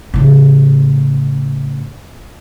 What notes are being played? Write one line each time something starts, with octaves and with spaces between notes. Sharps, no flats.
A2 C#3